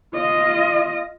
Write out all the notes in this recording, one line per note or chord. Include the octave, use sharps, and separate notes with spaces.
F4 D#5